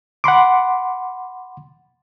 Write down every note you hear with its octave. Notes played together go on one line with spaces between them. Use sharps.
F#5 B5 C6 D6